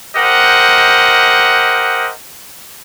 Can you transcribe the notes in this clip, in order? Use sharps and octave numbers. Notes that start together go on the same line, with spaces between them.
G4 A#4 C5 D#5 F#5